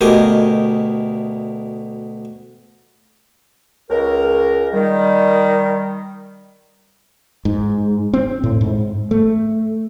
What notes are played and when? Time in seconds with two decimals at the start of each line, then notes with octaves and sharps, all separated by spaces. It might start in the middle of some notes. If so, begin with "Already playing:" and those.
0.01 D2 B2 G4 A#4 D#5 G#5
3.90 C#2 A#4
4.73 D#3 G3
7.45 G#2
8.13 C4
8.44 A2
8.61 G#2
9.11 A3